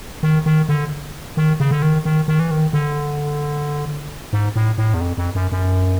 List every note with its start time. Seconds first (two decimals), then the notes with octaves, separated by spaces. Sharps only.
0.23 D#3
0.46 D#3
0.69 D3
1.37 D#3
1.60 C#3
1.71 D3
1.82 D#3
2.05 D#3
2.28 D#3
2.39 E3
2.51 D#3
2.73 D3
4.33 G#2
4.56 A2
4.78 A2
4.94 E2
5.01 F2
5.18 F2
5.35 F#2
5.52 F#2